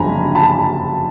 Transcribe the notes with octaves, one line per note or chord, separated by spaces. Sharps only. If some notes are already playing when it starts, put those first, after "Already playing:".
Already playing: F#1 F2 D3 G3 G#5 A#5 B5
A5 B5